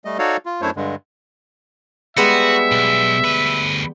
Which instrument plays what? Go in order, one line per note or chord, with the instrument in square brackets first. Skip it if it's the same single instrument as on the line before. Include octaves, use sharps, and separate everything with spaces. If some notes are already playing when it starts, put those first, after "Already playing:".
[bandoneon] G3 A3 D#5
D#4 F#4 A4 C#5 D5 F5
F4
F#2 A3 D4 E4 C5 C#5
G2 D3 G#3
[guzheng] G3 G#3 B3 [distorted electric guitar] F#4 [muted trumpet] E5
[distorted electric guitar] B1
D2 B4